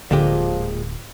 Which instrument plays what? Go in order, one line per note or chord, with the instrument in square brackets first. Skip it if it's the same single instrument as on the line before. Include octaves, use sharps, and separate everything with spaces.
[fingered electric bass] D1 [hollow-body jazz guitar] A#2 G#3 G4 [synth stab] D3 [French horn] F3